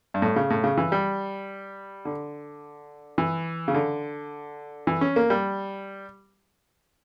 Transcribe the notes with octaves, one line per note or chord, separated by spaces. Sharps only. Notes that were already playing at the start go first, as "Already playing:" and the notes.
G2
A2
C#3
A2
C#3
E3
G3
D3
E3
C#3
D3
E3
C#4
A#3
G3